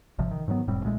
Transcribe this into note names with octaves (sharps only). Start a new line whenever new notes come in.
G#1 C3 F3
D#3
G#2 D#3 F#3 B3
F1 A2 G3 C4
B1 A#2 G#3 A3